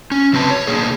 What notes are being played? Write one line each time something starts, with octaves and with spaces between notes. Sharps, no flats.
C#4
C#3 F#3 C4 B4 A5
C#5
B2 D3 D#3 A#3 G#4